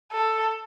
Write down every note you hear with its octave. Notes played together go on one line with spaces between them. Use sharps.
A4